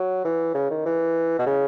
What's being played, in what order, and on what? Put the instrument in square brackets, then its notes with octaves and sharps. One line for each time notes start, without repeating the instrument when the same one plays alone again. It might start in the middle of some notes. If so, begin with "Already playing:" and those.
Already playing: [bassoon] F#3
E3
C#3
D#3
E3
B2
C#3